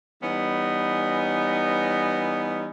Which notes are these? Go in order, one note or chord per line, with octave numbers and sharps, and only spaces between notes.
E3 G3 B3 C#4 D#4